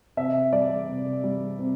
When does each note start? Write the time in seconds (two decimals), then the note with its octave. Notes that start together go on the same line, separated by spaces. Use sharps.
0.17 C3 E5
0.53 G3 D5
0.89 C3
1.24 G3
1.59 C3